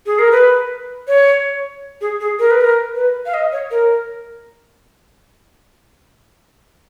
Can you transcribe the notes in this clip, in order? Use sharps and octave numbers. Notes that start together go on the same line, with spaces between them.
G#4
A#4
B4
C#5
G#4
G#4
A#4
B4
A#4
B4
F5
D#5
C#5
A#4